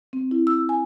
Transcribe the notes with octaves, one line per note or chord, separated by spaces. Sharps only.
C4
E4
E6
G#5